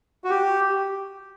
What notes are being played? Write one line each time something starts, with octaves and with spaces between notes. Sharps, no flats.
F#4
G4